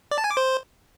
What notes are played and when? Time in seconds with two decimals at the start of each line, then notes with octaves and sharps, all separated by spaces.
0.11 D5
0.18 A5
0.24 G#5
0.31 D6
0.37 C5